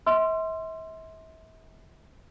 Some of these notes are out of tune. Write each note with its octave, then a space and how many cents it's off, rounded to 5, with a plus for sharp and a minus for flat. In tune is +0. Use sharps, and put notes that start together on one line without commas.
E5 -40 C6 +0 E6 +45